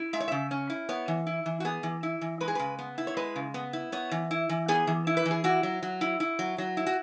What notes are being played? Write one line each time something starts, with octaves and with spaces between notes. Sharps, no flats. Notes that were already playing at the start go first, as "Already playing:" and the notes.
Already playing: E4
G#3 E5
C#5
C#3 E5
C#4
E4
B3 C#5
E3
E4
E3
F#4
B3 G#4
E3
E4
E3
G#3 B4
G#4
C#3 B4
B3
E4
C#5
G#3 B4
C#3
B3
E4
B3 C#5
E3
E4
E3
B3 G#4
E3
E4
B4
E3
G#4
E4 F#4
F#3
F#3
E4
E4
F#3
F#3
E4
F#4